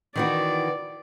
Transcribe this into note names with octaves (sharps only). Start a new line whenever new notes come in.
D#3 E3 F#4 D5